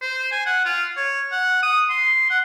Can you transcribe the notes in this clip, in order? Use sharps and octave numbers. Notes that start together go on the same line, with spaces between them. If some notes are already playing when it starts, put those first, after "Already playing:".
C5
G#5
F#5
F4
C#5
F#5
D#6
C6
F#5